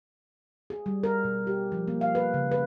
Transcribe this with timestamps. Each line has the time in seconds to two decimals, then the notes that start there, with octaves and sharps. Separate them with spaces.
0.70 G#4
0.86 G3
1.03 A#4
1.24 B2
1.47 G4
1.72 F3
1.88 A#3
2.01 F5
2.15 B4
2.34 C#3
2.51 B4